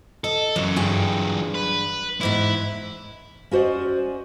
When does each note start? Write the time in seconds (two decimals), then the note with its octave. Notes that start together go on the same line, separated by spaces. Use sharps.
0.24 A4 D#5
0.56 F#2 C#3 E3 F#3
0.76 G2 G#4 G5
1.54 B4
2.21 E2 G#2 B3 E4
3.51 C#4 F#4 C5 D5 D#5